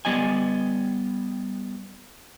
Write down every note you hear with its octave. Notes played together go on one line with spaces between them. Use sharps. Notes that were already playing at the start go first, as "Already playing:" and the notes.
G3 B3 D5 D#5 G#5